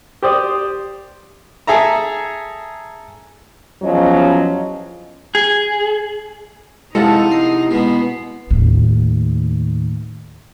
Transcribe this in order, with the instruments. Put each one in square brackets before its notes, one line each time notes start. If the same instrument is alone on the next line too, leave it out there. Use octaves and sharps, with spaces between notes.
[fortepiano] G4 C5 D5 D#6
G#4 A4 E5 A#5
[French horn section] E2 F3 F#3 C#4 D#5
[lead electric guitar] G#4
[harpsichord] C3 F3 F#3 [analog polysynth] G#3 A4 [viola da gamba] D#4 [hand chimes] E4
[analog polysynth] C7
[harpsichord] B2 G#3 [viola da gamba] B3
[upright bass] D#2 A2